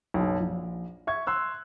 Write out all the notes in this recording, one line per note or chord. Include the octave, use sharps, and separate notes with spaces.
F#1 B1
A#1
E5 C#6 G#6
C6 E6 F#6